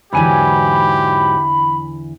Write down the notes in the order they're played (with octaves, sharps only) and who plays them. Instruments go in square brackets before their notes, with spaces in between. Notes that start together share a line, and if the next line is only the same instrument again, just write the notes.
[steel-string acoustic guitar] E2 D3 E3 [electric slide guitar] G#2 F#3 G#5 [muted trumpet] G4 [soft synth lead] B5